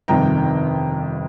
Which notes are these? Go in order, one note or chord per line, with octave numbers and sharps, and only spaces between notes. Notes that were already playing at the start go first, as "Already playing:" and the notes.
G1 F2 C3 D#3 G5 A#5